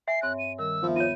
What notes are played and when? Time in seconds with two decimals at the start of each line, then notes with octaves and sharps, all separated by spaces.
0.08 E5 G#5 C7
0.22 G2 C4 C#5 F#6
0.39 D#7
0.59 D#3 G3 A#4 E6
0.83 D#2 F3 B3 E5
0.96 F4 C#5 D#7